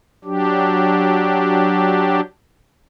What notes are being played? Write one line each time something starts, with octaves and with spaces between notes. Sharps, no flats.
F#3 D4 G4